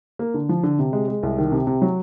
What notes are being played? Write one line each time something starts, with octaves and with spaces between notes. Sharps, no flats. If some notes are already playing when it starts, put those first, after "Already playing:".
A#3
D3
F3
D3
C3
G#3
G#3
C2
D#3
C3
C3
F#3